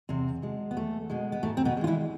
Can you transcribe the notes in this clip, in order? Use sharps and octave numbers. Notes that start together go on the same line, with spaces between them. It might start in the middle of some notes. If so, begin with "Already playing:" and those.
E2 C3 C4
B2 G#3
B3
E2 A3
B2 G#3
B3
G#2 A3
C4
B2 B3
E3 G#3
F4
E3 E4